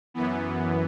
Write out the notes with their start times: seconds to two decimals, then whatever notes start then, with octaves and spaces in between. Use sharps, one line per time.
0.14 F#2 E3 B3